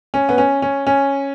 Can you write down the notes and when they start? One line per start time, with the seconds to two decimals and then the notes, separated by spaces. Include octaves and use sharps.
0.14 C#4
0.29 B3
0.38 C#4
0.62 C#4
0.87 C#4